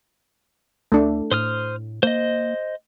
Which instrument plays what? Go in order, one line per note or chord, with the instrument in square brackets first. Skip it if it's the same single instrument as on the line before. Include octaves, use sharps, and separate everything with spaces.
[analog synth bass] D2 [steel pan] A3 D4
[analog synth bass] A2 [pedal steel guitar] C5 D#6 F6
[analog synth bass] A#3 [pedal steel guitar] C5 D#5